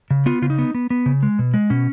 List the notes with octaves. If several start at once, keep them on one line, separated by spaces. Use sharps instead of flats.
C#3
B3 F4
C#3 F4
D#4
B3
B3
B3
C#3
G#3
B2
G#3
B2 C#4